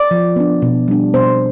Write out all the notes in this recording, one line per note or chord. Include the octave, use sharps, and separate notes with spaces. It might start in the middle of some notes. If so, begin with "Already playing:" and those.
Already playing: D5
F3
B3 D4
B2
G3 D4
B2 C5